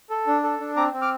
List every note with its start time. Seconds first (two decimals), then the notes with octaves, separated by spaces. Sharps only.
0.10 A4
0.27 D4
0.44 A4
0.60 D4
0.76 C4 A#5 D6
0.93 C4
1.01 D6 F6